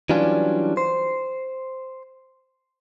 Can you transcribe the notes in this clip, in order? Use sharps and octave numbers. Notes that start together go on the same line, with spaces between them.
E3 F#3 G3 C#4 D4 F4
C5